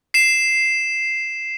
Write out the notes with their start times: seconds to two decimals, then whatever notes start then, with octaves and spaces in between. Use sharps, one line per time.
0.14 C7 E7